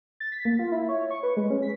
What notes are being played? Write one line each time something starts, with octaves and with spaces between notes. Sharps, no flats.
A6
B6
A#3
F4
E4
C#5
C#6
B4
G#3
C#4
B6